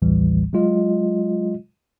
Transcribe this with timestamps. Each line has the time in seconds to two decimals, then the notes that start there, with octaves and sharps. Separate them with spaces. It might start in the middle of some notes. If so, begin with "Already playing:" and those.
0.02 A#1 D#2 A2 E3 G3
0.53 F#3 G#3 F4 D#5